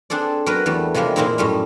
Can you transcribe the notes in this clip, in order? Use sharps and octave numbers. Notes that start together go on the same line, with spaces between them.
C4 D4 G#4 A4 D5
F#3 B3 A#4 B4
E2 G3 A3
C3 F3 G3 G#3 A#3
F2 A#2 G#3 C4 D#4 E4
F#2 A2 G3 A3 C#4